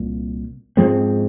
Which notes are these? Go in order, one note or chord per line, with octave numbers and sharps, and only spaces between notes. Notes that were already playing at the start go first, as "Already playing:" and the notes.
Already playing: C2 A#2
G#2 F3 G#3 C4